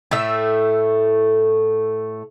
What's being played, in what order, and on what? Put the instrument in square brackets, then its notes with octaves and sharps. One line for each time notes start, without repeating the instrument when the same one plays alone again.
[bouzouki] A2 A3 E5